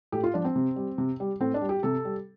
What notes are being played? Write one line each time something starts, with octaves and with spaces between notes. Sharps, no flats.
A2 G4
F4
F3 D4
C4
C3
G3
C3
G3
A2 C4
D4
G3
G4
C3 A4
G3